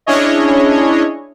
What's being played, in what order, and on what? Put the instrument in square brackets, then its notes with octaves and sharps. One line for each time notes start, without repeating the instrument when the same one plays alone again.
[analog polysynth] C#4 D4 E4 G#4 C#5 D#5